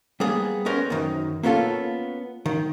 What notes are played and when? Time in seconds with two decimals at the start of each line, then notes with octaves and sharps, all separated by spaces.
0.20 G3 A#3 B3 G#4
0.66 B3 C#4 A#4 C5
0.90 F#2 D#3
1.43 A#3 B3 C#4 F4 A4
2.46 D#3